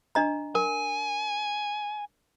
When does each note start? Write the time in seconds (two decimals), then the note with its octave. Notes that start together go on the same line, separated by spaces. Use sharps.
0.15 D4 D#5 A#5
0.55 A#4 G#5